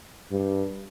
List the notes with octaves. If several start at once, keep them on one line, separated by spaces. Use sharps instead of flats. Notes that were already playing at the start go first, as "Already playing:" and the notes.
G2